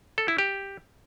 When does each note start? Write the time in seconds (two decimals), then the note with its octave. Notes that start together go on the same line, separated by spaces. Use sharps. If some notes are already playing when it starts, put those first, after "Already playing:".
0.18 A4
0.28 E4
0.38 G4